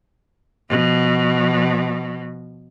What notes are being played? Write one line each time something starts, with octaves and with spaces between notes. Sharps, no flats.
B2 F3